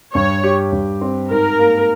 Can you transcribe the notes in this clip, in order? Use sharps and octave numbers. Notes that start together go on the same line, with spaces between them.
G2 C#5
G4
G2
C4
G#2 A#4
A#3